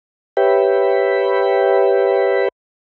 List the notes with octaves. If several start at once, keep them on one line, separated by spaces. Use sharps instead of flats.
G4 B4 C#5 E5 G5 B5